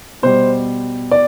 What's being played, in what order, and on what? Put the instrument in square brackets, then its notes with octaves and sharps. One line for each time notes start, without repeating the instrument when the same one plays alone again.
[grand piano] B2 G3 C5
D5